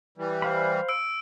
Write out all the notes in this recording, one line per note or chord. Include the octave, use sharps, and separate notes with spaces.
E3 G3
C5 F5 B5
E6 D7